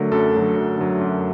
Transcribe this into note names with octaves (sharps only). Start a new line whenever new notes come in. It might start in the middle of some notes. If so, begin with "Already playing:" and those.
Already playing: D3 F#3 A3 A#4
F#2 A4
D3 F#3 A3
F#2
D3 F#3 A3
F#2